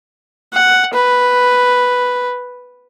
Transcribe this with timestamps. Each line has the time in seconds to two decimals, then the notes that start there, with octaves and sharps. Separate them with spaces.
0.53 F#5
0.94 B4